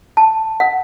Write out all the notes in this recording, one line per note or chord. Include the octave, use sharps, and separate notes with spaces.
A5
F#5